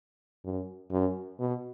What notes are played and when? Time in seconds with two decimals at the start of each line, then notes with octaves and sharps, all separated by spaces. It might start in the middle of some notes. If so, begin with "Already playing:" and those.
0.44 F#2
0.91 F#2
1.40 B2